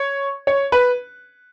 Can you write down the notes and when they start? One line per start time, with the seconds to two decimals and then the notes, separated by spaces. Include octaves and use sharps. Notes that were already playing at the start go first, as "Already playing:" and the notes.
Already playing: C#5
0.47 C#5
0.72 B4